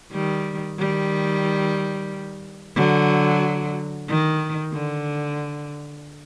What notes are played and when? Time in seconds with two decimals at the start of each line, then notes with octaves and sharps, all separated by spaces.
0.12 D#3 G3
0.78 D#3 G3
2.75 D3 F#3
4.08 D#3
4.73 D3